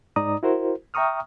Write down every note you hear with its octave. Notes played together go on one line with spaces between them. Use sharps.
G#2 D#4 D5 A#5 D#6
E4 F#4 A#4 C5
E5 G5 A#5 C#6 D#6 F6